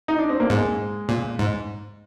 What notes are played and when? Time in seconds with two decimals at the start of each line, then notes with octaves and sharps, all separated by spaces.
0.08 D#4
0.18 D4
0.29 C4
0.40 A#3
0.50 G#2 G#3
1.09 A#2
1.39 G#2